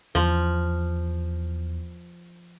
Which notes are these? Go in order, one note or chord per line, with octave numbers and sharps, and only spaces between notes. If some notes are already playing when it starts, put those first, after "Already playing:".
E2 F3